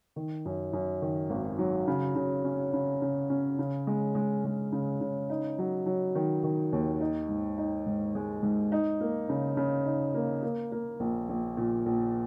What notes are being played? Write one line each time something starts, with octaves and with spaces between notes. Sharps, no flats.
D#3
F#2
F#2
D#3
G#1
F#3
C#3
C#3
C#4
C#3
C#3
C#4
C#3
G#3
G#3
G#3
C#3
C#3
D#4
F#3
F#3
D#3
D#3
D#2
D#4
G#2
D#4
G#2
G#3
G#2
D#4
A#3
C#3
C#3
D#4
A#3
A#3
A#3
A#1
A#1
A#2
A#1